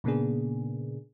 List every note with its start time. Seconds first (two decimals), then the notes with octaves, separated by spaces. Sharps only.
0.04 A#2 C#3 A#3 B3 D4 G#4